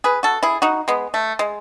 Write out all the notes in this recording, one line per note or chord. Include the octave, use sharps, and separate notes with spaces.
G#4 B4
F#4 A4
E4 G#4
D#4 F#4
G#3 B3
A3
G#3